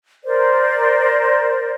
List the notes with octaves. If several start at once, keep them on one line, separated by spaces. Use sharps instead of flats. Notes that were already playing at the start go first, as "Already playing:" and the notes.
A#4 C5 D5